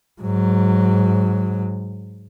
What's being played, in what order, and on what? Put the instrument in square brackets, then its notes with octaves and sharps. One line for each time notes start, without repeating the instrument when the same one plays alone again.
[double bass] G#2 F#3